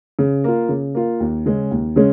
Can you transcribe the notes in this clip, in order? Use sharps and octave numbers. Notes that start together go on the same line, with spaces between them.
C#3
A#3 F4
C#3
A#3 F4
D#2
C#3 G#3 C#4
D#2
C#3 G#3 C#4